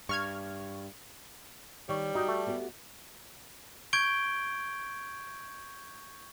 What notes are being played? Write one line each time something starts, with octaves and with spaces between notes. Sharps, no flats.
G2 C#6 F6 G#6
D#3 G3 C#5
D#4 F#4 G5
A3
B3 F#4 G4
C#6 G6 G#6 D7 G7